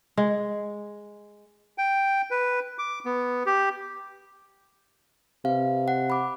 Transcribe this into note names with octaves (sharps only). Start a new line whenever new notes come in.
G#3
G5
B4
D6
B3
G4
C3 B4 F5
F#5
B5 D6